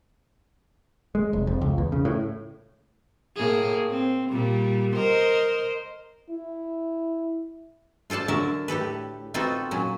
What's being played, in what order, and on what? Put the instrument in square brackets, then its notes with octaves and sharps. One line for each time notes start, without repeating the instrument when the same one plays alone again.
[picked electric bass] G#3
F1
F2
C#2
E2
C#3
A2
[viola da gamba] A2 A#3 G#4
C4
A#2 G3
A#4 C5 D#5
[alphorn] E4
[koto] F4 A4 C5 D5 A5
D3 F#3 A#4 E5 A5
A2 G4 A4 B4
B3 C4 D#4 F4 F#4 A4
A#2 F#3 C#4